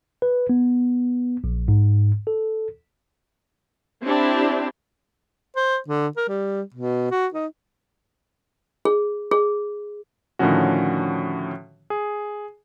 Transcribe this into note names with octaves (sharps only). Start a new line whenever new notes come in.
B4
B3
A#1
G#2
A4
C4 D4 E4 G4
C5
D3
A#4
G3
B2
F#4
D#4
G#4
G#4
A2 D3 D#3 F3 C#4 F#4
G#4